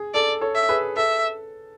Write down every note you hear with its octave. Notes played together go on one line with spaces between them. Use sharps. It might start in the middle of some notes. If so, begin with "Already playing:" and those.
Already playing: G#4
A4 D5
A4 C#5
E5
G#4 B4
A4 E5